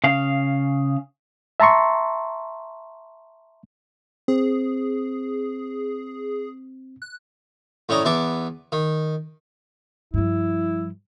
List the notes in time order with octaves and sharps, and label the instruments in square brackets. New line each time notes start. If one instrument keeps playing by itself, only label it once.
[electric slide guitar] C#3 F5
[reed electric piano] E5 A5 A#5 C6 C#6
[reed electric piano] C4 [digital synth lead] G#4
[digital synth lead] F#6
[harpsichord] A2 C#4 D5 D#5 A#5
E2 B3 E5 A5 D6
D#3
[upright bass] G2 F3 [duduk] E4